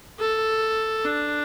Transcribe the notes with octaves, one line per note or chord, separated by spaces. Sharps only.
A4
D4